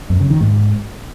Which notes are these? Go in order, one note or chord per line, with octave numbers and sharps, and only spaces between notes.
F#2
C#3
D#3
G#2